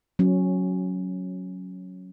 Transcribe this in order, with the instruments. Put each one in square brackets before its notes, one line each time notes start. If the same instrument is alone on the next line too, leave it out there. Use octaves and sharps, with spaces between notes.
[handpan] F#3 C#4